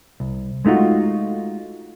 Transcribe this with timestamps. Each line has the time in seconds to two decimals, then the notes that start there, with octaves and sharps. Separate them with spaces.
0.20 C2
0.65 G#3 A3 D#4 F4 F#4